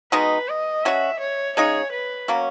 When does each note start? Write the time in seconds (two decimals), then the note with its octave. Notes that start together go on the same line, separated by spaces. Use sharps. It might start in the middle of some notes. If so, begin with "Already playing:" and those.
0.12 B2 G#3 D#4 B4
0.49 D#5
0.84 F#3 C#4 F#4 E5
1.20 C#5
1.57 C#3 G#3 D#4 G#4 C#5
1.92 B4
2.28 B2 F#3 A#3 C#4